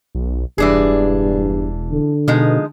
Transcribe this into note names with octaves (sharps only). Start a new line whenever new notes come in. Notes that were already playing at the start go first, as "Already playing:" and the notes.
B1
E1 G2 E3 D4 G#4
D3
B2 F3 G#3 D#4